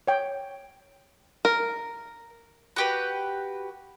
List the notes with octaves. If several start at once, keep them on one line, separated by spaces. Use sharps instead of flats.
C#5 G5
A#4
F#4 G4 B4